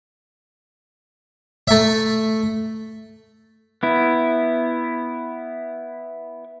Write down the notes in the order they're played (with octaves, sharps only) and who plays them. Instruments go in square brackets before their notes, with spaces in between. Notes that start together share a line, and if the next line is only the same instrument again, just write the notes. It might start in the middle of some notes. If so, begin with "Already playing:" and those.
[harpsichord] A3 E5
[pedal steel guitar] B3 E4